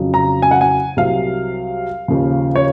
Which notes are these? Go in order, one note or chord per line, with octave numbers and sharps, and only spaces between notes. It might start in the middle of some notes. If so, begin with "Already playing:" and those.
Already playing: F2 C#3 F#3
A#5
G#5
F#5
G#5
C2 C3 F#3 F5
D#2 C#3 F3
C#5